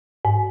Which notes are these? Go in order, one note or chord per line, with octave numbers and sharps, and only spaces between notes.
G#2